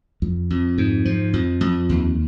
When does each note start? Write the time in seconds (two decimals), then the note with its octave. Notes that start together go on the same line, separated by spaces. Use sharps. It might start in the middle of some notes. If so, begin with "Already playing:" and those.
0.22 F2
0.50 F2
0.78 G#2
1.05 F3
1.33 F2
1.61 F2
1.89 D#2